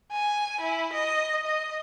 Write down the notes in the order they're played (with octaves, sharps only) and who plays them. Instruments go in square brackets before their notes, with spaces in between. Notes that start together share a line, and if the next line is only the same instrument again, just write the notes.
[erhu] G#5
E4
D#5
D#5